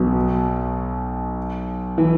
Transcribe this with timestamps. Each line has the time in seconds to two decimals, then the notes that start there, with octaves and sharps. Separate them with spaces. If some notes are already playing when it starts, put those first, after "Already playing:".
Already playing: B1 B2
1.98 E3